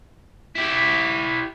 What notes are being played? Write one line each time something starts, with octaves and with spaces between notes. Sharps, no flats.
E4 G4